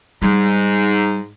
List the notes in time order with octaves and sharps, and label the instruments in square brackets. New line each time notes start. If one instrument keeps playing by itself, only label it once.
[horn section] G#2 [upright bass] G3